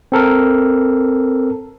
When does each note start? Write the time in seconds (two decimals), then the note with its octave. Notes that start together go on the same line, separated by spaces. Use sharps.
0.12 C4 A4 A#4